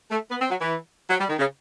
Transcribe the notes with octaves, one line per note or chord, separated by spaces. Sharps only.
A3
B3
C4
F#3
E3
F#3
G3
D#3
C#3